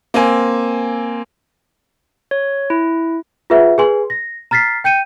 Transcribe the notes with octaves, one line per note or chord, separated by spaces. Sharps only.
A#3 C4 G#5
C#5
E4
F4 G#4 B4 E5 F#5
G#4 B4 G#5 C6
A#6
A#5 F6 A6 B6 C7
G5 G6 C#7 D#7